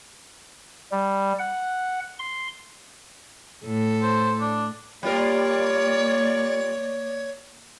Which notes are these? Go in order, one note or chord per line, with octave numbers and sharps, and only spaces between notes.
G3
F#5
C6
A2 A4
C5
D4
G3 A#3 F4 A#4 C#5 D5